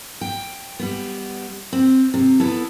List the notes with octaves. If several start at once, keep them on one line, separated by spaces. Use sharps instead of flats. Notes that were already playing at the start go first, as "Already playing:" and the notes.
G5
G3 B3
C4
C3
B3 E4 A4